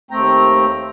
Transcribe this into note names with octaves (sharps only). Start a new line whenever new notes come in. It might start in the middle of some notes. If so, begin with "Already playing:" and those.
D#2 A3 C4 G5 A#5